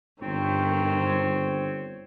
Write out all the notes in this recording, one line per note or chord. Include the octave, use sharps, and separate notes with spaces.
G1 G2 D#3 C4 C#5